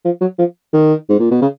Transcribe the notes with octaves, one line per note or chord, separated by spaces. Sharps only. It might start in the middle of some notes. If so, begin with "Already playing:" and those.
F3
F#3
F3
D#3
G#2
A#2
B2
C#3